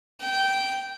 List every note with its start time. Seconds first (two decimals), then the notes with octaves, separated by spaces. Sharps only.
0.20 G5